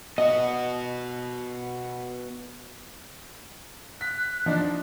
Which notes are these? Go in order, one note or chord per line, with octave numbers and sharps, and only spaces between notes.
B3 F#4 D#5
F#6 B6
F3 D4 D#4 D#5